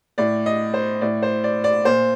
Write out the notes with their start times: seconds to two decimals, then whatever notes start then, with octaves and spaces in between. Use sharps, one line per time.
0.18 A2 D5
0.46 D#5
0.74 C5
1.01 A2 D5
1.22 C5
1.44 D5
1.64 D5
1.85 A#2 C5